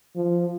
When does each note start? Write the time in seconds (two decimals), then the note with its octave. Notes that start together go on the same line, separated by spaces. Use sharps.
0.16 F3